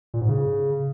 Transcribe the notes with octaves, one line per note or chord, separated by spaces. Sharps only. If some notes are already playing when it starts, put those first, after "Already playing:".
A#2
G#2
C#3